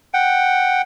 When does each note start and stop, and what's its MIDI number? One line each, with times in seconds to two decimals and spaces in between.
0.14 0.82 78
0.14 0.82 79